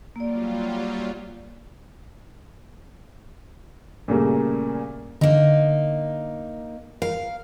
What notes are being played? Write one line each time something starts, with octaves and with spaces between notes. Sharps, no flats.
F#3 G3 A#3 F4 D5
A#2 C#3 G3 A3 A#3
D3 A#3 D#4
A#4 F5